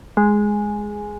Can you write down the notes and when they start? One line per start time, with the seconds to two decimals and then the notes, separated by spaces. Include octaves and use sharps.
0.17 G#3